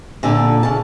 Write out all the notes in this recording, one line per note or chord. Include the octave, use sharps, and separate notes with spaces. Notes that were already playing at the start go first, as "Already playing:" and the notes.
A#2 D3 A4
C#3 A5